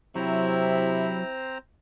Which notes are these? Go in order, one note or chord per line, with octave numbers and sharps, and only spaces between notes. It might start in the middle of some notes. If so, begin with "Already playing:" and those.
C3 F#3 C4 E4 C5 A#5